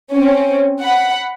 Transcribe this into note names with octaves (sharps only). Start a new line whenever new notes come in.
C4 C#4
F#5 B5